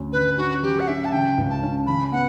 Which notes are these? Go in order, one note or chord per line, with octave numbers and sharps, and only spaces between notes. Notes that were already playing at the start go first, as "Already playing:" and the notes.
Already playing: D2 C#4
D3 B4
C#4 F#4
F#3 G4
F#5
C#4 E5
A5
C#3 G5
C#2
A5
C#4
C#3 B5
B3 F#5